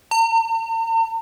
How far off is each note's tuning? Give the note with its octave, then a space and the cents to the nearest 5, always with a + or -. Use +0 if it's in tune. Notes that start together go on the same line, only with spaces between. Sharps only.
A#5 -45